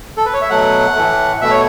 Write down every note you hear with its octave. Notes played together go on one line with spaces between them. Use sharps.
A4
B4
C#5
E5
B2 F#3 A3 F#5
A2 E3 A3
B2 A3 E5
C#5